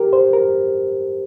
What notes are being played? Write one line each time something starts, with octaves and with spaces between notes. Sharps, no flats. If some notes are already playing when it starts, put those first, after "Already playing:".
Already playing: G4 A#4
C5
A#4